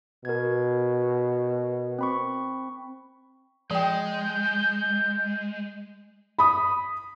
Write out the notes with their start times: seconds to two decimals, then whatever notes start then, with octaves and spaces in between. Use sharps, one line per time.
0.25 B2 A#4 G#6
1.99 C4 B5 C#6
3.71 F3 G#3 G5 G6
6.38 B5 D#6